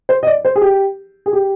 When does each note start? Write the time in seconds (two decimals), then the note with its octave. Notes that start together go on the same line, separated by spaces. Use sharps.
0.09 C5
0.23 D#5
0.27 D5
0.45 C5
0.56 G#4
0.62 G4
1.26 G#4
1.33 G4